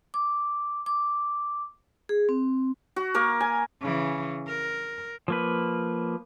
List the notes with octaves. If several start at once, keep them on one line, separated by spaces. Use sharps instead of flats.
D6
D6
G#4
C4
F#4
A#3 A#4 F5
G#5
C#3 E3
A#4
F3 A#3 B4